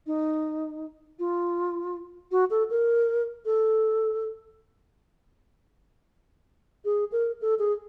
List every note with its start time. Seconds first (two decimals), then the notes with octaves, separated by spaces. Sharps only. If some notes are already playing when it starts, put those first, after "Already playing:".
0.07 D#4
1.19 F4
2.32 F#4
2.50 A4
2.70 A#4
3.45 A4
6.85 G#4
7.12 A#4
7.41 A4
7.59 G#4